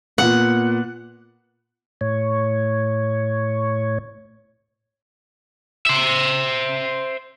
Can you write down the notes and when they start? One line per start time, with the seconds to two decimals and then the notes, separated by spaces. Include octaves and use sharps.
0.18 A#2 B3 F#5
2.01 A2 C#5
5.86 C5 E5